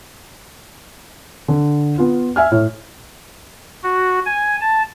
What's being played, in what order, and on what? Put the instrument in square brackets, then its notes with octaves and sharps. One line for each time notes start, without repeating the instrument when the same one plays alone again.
[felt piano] D3
B3 F4
E5 G#5 F6
A2
[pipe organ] F#4
G#5
A5